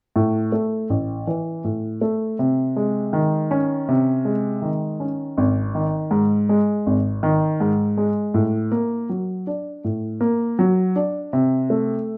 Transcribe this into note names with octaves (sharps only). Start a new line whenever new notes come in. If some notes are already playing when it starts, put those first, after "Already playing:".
A2
A3
A1
E3
A2
A3
C3
G#3
D#3
C#4
C3
G#3
D#3
C#4
G#1
D#3
G#2
G#3
G#1
D#3
G#2
G#3
A2
A#3
F#3
D4
A2
A#3
F#3
D4
C3
A3